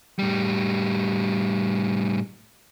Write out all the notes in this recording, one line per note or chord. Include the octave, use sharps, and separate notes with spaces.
A2 G3